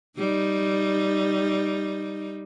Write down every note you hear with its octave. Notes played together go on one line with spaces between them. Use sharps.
G3 D#4